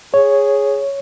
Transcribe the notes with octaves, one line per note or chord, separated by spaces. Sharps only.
G#4 C#5